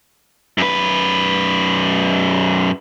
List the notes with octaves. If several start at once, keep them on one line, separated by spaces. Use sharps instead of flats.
F#2 B4